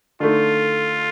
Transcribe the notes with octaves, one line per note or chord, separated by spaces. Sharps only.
D3 A3 D#4 F4